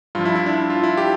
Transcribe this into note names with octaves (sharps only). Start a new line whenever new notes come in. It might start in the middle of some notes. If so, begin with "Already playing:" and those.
G2 F3 F4
E4
E4
D4
F4
E4
G4